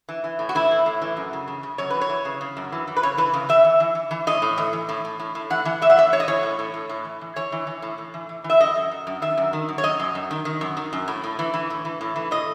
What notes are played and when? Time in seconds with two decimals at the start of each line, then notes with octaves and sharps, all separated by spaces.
0.09 E3
0.24 E3
0.39 A2
0.49 F#4
0.55 E3 E4
0.71 A2
0.86 A2
1.02 E3
1.17 F#2
1.33 C#3
1.48 C#3
1.63 C#3
1.78 F#2 C#5
1.90 E3 B4
2.01 C#5
2.09 E3
2.25 C#3
2.41 C#3
2.57 F#2
2.72 E3
2.87 E3
2.97 B4
3.03 C#3 C#5
3.18 E3 B4
3.33 C#3
3.49 E3 E5
3.65 E3
3.80 E3
3.95 E3
4.11 E3
4.27 A2 D#5
4.42 A2
4.58 E3
4.73 E3
4.89 A2
5.05 A2
5.20 A2
5.35 A2
5.50 E3 F#5
5.65 E3
5.82 A2 E5
5.90 F#5
5.97 A2 E5
6.13 A2 C#5
6.20 D#5
6.28 E3 C#5
6.43 A2
6.59 A2
6.74 A2
6.89 A2
7.05 E3
7.21 E3
7.36 E3 C#5
7.52 E3
7.67 E3
7.82 A2
7.98 A2
8.14 E3
8.29 E3
8.44 E3
8.50 E5
8.60 F#2 D#5
8.75 F#2
8.91 F#2
9.07 F#2
9.22 D#3 E5
9.38 F#2
9.53 D#3
9.69 F#2
9.78 C#5
9.84 F#2 D#5
10.00 F#2
10.15 F#2
10.31 D#3
10.45 D#3
10.61 F#2
10.77 D#3
10.93 F#2
11.08 A2
11.24 A2
11.39 E3
11.54 E3
11.70 A2
11.85 E3
12.01 A2
12.16 E3
12.31 A2 D#5